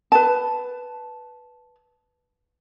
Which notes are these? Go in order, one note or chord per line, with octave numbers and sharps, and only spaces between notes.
B4 A5